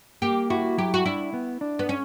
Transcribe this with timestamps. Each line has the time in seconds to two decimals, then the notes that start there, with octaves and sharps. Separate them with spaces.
0.22 A#3 G4
0.50 E4 F#4
0.78 F#3 G4
0.94 F#4
1.06 D4 E4
1.34 B3
1.61 D4
1.79 B3
1.89 C#4